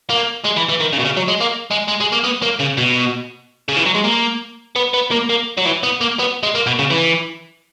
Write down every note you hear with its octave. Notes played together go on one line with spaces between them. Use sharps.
A#3
G#3
E3
E3
D#3
C#3
B2
C#3
F#3
G#3
A#3
G#3
G#3
G#3
A#3
B3
A#3
C#3
B2
C#3
E3
F#3
G#3
A#3
B3
B3
A#3
A#3
F#3
E3
B3
A#3
B3
G#3
A#3
B2
C#3
E3